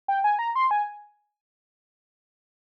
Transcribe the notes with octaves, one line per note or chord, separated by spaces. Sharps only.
G5
G#5
A#5
C6
G#5